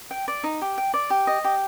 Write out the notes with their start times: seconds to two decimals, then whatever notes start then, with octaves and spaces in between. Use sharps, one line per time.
0.11 G5
0.28 D5
0.44 D#4
0.61 G4
0.78 G5
0.94 D5
1.10 G4
1.27 D#5
1.44 G4